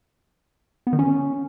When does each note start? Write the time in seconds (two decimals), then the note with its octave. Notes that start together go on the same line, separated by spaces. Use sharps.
0.87 B3
0.93 D#3
0.99 C#4